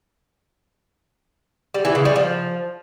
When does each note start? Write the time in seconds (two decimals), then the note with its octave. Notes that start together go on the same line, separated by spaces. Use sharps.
1.74 G3
1.85 E3
1.95 C#3
2.05 G3
2.16 F3